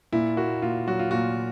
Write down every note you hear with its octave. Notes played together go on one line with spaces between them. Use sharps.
A#2 E4
A#3 F#4
A#2 F4
F#3 F#4
F4
A#2 F#4